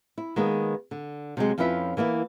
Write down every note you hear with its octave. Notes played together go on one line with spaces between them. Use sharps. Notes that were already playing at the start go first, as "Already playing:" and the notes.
E4
D#3 G#3 A#3 B3
D3
C3 F#3 G#3
F2 F3 C#4 E4 B4 E5
E3 A#3 B3 E4